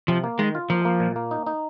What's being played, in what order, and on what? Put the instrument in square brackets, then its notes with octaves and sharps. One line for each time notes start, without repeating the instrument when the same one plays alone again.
[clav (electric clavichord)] C3 [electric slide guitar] F3
[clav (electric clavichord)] A#3
[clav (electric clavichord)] D#3 [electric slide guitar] G#3
[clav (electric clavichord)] F4
[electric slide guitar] F3 [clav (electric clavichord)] A#3
[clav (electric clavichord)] A#3
A#2
A#3
D#4
D#4